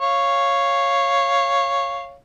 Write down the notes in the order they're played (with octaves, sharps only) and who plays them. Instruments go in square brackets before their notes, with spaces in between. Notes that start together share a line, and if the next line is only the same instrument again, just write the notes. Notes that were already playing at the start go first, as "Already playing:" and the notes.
[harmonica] C#5 F5